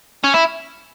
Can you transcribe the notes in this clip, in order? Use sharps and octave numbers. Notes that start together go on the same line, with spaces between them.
C#4
E4